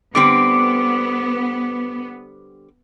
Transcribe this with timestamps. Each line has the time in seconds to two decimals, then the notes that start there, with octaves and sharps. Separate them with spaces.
0.15 D3 G3 B3 C4 D6 D7